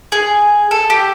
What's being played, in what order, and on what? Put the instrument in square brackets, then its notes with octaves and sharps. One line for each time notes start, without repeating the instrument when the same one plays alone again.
[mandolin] G#4
A4
G4